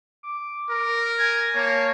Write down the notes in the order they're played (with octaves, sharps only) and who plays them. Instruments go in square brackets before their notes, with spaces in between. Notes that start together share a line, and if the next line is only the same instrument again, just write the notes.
[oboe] D6
[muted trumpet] A#4
[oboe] G#5 [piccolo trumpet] G#6
[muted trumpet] A#3 [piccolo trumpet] C#5 [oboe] A5